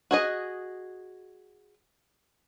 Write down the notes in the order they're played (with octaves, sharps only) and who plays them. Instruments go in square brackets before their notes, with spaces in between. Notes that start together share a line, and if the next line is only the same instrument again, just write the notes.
[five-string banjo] F#4 G#4 D#5